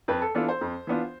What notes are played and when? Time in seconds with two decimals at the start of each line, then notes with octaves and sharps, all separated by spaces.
0.08 F2 B4
0.22 A4
0.35 E3 B3 D4 F4 A4
0.49 C5
0.61 F2
0.87 E3 B3 D4 F4